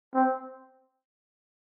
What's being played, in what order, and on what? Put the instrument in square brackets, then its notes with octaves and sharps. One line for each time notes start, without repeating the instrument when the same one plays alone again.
[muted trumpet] C4